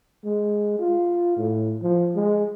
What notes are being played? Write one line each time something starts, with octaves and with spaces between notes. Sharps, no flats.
G#3
F4
A2
F3
G#3